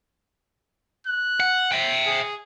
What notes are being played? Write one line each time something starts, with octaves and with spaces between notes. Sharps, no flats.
F#6
F#5
E5 G5
G#4